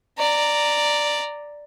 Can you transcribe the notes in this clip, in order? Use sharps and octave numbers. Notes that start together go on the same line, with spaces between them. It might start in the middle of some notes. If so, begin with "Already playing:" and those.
D5 A#5